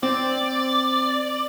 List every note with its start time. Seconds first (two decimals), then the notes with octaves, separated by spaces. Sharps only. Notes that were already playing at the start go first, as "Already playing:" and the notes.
0.03 C4 D5